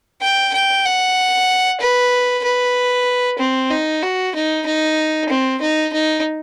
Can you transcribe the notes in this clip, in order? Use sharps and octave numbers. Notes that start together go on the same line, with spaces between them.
G5
G5
F#5
B4
B4
C4
D#4
F#4
D#4
D#4
C4
D#4
D#4